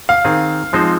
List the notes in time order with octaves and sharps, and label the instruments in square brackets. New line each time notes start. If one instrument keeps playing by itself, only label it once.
[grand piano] F5
[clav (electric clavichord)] D#3 C4 G#4
F3 G#3 C4 D#4 C5